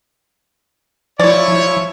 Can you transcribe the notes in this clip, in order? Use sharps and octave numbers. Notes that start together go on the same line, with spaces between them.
F3 E4 C#5 D5